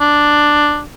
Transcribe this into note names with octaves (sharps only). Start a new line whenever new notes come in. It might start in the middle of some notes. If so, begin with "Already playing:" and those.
D4